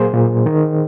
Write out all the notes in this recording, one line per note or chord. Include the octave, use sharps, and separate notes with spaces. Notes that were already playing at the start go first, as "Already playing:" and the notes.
Already playing: A#2 F#3 A#3 G#4 C5
A#2
D#3